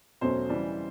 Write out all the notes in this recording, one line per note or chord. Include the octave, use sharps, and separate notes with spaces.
E2 B2 F#3 A3 C#4 C5
C#3 E3 G3